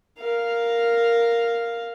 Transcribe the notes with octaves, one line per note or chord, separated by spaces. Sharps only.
A#4 F5